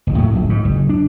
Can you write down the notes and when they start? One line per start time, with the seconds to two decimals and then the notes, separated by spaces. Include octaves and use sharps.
0.07 F#1 D#2
0.18 A2 F#3 A3
0.33 D1 A#1
0.50 G#2
0.65 F#1
0.89 D4